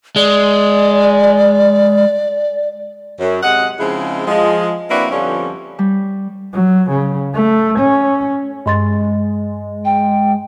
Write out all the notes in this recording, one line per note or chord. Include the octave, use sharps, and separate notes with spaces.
G#3 D5
F#2
C3 G#3 D#5 F#5
C#3 F3 G#3 C4 D#4 E4
F3 G#3
A#3 C4 D4 E4 F#4 B4
F2 D3 F3 G3 B3 C#4
G3
F#3
C#3
A3
C#4
G2 G#3 C6 A6
G5